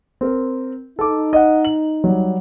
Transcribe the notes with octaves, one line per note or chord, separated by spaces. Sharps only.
C4 A#4
D#4 A4 D6
D#5 F#5
F#7
F#3 G3